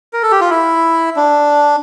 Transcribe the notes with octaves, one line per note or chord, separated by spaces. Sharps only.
A#4
A4
G4
F4
E4
D4